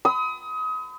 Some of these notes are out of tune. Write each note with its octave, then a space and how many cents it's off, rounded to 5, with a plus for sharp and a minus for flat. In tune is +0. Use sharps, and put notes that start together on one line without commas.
B5 +40 D#6 +30